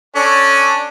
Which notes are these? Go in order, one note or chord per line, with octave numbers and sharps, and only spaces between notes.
C#4 D4 A4